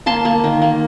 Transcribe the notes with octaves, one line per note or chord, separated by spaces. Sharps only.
A#3 A5 C6
A#3
D#3
A#3